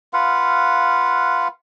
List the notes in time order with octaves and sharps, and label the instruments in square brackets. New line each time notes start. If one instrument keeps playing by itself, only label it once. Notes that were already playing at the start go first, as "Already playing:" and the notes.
[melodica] F4 B4 F5 F#5